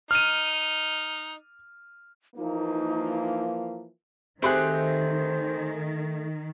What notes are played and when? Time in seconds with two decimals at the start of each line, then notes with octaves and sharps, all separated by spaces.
0.11 D#4 F6 D#7
2.36 E3 F3 A#3 D#4
4.42 D#3 A3 C4 G4 G#4 C5 C6 F#6